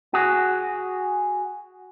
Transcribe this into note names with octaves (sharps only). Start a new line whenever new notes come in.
F#4 G#4